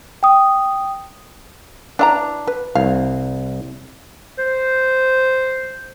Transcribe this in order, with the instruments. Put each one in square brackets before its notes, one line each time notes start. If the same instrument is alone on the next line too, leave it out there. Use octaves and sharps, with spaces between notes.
[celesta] G5 D#6
[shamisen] E3 F4 A#5 [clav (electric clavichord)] D4
[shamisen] B4
[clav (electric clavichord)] C2 [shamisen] F5
[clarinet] C5